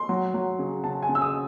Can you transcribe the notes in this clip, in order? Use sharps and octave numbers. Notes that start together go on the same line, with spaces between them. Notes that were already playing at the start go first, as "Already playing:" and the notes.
Already playing: C6
F#3
F#3
C#3
C#3 A5
G#5
C#3
E6
D#6